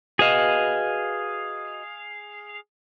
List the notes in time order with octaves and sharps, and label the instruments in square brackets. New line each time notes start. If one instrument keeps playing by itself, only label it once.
[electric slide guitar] F#4 B4 D#5 [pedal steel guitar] G#4 F5